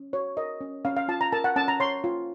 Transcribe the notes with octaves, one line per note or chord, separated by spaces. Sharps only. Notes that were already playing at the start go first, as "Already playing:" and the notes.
Already playing: C#4
F#4 C#5
A#4 D#5
C#4
C#4 F5
F5
F4 A5
A#5
A#4 A5
F#5
C#4 A5
A#5
C#5 C6
F4